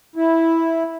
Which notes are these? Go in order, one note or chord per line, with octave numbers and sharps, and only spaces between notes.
E4